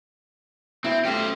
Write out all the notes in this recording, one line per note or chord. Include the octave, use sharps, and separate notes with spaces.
B2 C4 E4
A3 C#4 F4 G4 C5